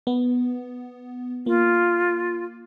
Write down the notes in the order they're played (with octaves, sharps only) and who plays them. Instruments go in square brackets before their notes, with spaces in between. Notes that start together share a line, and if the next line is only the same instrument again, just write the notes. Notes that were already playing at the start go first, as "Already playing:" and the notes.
[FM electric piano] B3
[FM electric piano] A#3 [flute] F4